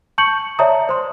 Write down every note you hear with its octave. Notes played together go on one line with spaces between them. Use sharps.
A5 C#6 G6 C#7 F#7
C#5 D5 E5 A5 A#5 D#6
C5 C6